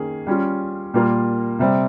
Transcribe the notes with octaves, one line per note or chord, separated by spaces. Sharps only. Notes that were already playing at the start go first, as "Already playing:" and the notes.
Already playing: D#3 A#3 C#4 G#4
G3 C#4 F4
A#2 G3 A#3 F4 A#4
C3 G3 C4